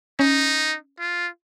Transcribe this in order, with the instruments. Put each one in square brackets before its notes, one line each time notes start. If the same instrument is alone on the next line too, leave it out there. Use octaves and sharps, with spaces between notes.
[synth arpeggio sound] C#4 [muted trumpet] D#4
[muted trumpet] F4